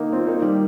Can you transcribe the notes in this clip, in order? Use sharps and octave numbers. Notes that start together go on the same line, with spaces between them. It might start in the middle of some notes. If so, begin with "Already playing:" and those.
Already playing: D#3 A#3 D#4
C4 F4
A#3 D#4
D#3 G3